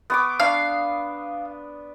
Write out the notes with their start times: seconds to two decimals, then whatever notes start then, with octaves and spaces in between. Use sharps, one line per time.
0.10 B3 C#6 D6
0.40 D4 F5